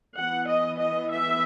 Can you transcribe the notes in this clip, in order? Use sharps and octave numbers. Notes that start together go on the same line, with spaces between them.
E3 B3 F#5
D#5
D#5
E5